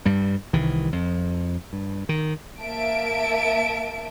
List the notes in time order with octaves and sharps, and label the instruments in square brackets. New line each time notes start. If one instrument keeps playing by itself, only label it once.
[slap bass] G2 G3
C2 D#3 E3
F2
G2
D#3
[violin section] A#3 E5 A5 D7